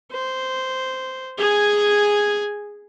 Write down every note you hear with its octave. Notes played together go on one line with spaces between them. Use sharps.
C5
G#4 G#5